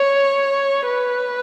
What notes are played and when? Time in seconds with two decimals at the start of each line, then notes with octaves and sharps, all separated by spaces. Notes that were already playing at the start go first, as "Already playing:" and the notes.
Already playing: C#5
0.86 B4